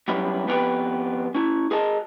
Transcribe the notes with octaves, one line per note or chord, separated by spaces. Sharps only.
F#3 G3 B3 C#4 E4 G4
F2 B3 C#4 G4 B4
C#4 E4
G#4 A#4 D#5 A5